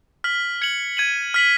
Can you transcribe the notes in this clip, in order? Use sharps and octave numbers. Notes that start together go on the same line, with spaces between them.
F6 B6 F#7
G#6 C#7 F#7
G#6 D#7 F#7
F6 B6 F#7